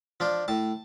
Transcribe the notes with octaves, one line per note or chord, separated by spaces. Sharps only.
F3 D4
A2 A5